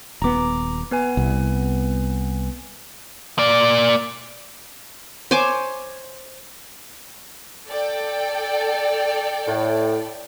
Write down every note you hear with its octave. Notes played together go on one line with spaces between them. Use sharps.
D#1 B3 A#5 D6
B3 B4 G#5
C2
A#3 D5
C5 C#5 G#5 D6
A4 D5 G5
A2